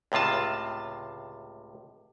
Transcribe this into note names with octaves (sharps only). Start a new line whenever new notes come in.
C#2 A2 C3 F4 A5